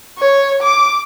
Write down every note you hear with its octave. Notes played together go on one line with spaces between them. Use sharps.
C#5
D6